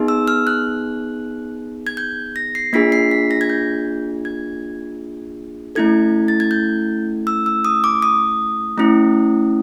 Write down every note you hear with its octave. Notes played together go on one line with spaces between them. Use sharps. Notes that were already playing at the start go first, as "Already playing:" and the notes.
Already playing: B3 D#4 G#4
E6
F6
F#6
G#6
G6
A#6
C7
A#3 D4 F4 G#4 B6
C7
B6
A#6
G#6
G6
G#6
A3 C#4 E4 A4 G#6
A6
G#6
G6
E6
E6
D#6
D6
D#6
A3 C#4 E4